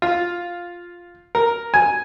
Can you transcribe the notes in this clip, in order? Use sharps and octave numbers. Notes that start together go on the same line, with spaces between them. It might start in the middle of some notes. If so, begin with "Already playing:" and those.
F4
A#4
G#5